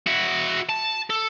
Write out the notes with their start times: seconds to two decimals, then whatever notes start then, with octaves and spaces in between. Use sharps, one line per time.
0.06 E4 F#4
0.69 A5
1.10 A4